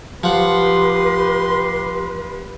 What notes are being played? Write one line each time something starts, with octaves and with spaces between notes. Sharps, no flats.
F3 G4 B4 F#5 C6